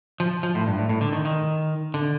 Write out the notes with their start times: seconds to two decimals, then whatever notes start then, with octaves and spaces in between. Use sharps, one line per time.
0.20 F3
0.43 F3
0.55 A2
0.67 G2
0.78 A2
0.89 A2
1.01 D3
1.13 D#3
1.25 D#3
1.94 D3